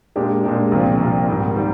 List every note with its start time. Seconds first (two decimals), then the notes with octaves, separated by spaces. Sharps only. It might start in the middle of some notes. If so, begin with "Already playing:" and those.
0.16 A#2 G#3 D4 G4
0.44 A#2 G#3 D4 G4
0.72 C2 A#2 F3
1.00 C2 A#2 F3
1.28 G#2 D#3 G3
1.56 D#3 G3